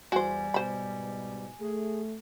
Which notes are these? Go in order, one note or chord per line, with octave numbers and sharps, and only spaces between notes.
E2 G3 F#4 C5 G#5
G#2 B2 C5 B5
A3 G#4